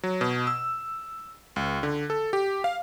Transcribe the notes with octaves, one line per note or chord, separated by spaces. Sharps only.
F#3
B2
E6
C#2
D3
A4
G4
F5